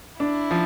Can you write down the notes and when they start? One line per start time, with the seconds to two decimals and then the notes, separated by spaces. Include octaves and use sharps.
0.20 D4 E4
0.51 F3